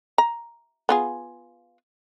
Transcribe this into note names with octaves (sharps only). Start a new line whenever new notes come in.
A#5
B3 F4 G#4